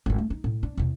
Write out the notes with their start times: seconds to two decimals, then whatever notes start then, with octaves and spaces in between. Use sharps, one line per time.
0.06 G#1 D#3
0.18 A3
0.30 D#4
0.44 A2
0.63 D4
0.77 E2 C3